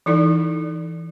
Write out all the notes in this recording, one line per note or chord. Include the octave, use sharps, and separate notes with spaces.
E3 D#4 E4 A4 D5